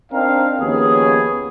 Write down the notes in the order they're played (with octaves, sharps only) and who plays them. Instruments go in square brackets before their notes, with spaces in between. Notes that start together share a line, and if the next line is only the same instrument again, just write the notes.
[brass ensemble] C4 D4 D#4 A#4 F5
D#2 F3 B3 C#4 G#4